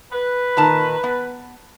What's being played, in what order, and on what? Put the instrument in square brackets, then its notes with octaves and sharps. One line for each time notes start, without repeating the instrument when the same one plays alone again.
[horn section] B4
[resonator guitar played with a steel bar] A#2 D#3 A5
B3